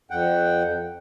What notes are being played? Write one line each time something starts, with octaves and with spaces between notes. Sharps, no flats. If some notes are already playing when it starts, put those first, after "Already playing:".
F2 F#5 G5